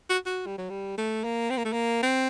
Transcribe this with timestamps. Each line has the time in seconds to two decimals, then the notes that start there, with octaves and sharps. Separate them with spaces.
0.10 F#4
0.26 F#4
0.46 G3
0.58 F#3
0.70 G3
0.98 A3
1.24 A#3
1.50 C4
1.57 A#3
1.65 A3
1.73 A#3
2.03 C4